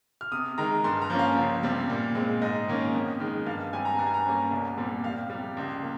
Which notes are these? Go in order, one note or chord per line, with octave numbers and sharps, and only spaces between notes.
F6
C3 D#6
D#3 G#3 A#5
G2 C6
A#5
F3 A#3 C#4
F5
C#2
C3 G3 C4
A#2
G#3 C4
G#2 D#5
D#3 A#3 C#4
F2
D#3 G#3
G2 F5
G3 C4 G#5
A#5
G2 A#5
G#5
A#5
G3 A#3 C#4
C2
A#2 G3 C4
F2 F5
C3 G3
C#2
A#3